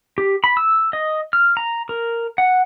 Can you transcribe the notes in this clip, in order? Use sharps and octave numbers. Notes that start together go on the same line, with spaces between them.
G4
B5
E6
D#5
F6
A#5
A#4
F#5